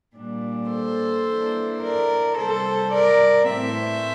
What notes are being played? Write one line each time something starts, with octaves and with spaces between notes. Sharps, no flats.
A#2 G3 A#3 D4
A4 C5
E3 A#3 D4
A#4 D5
C3 G3 C4 A4 C5
A#4 D5
A2 E3 A3 C4 C5 E5